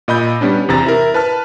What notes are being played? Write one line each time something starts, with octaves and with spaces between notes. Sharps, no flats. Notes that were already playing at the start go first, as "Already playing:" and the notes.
A#2 D#5 B5 G6
G3 B3 C#4 D4
E2 C3 A#5 A6
E4 A#4
B4 A5 F6